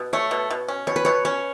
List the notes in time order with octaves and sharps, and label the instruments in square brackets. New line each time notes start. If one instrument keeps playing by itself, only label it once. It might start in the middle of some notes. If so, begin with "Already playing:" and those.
Already playing: [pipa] B2
[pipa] A3 [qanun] C#5
[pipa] B2
B2
C#4
[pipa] B2 [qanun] C#5
[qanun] B4
[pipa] B2 [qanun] C#5
[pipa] C#4 [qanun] C#5